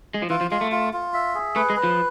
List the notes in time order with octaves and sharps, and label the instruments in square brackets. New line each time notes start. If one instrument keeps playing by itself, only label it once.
[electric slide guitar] G#3
F3
[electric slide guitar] E3 [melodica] F4
[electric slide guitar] F3
[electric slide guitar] G#3 [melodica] F4
[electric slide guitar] A3
[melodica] F4
F4
E5
G#4
[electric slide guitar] A3 [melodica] B4
[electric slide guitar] G#3
[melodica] B4
[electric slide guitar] F3